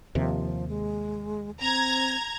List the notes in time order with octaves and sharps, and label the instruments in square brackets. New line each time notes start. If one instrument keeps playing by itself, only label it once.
[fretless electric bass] D#2 C3 [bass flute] F3
[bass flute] G#3
[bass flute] C4 [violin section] A#5 G#6